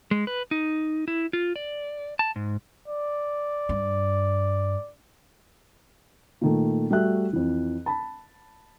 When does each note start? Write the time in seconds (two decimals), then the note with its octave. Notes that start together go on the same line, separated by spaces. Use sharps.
0.11 G#3
0.27 B4
0.51 D#4
1.08 E4
1.33 F4
1.56 D5
2.19 A5
2.36 G#2
2.88 D5
3.69 G2
6.41 A#2 D#3 A3
6.90 G3 A3 F#4 E5 F#6
7.33 F2 E3
7.86 A5 B5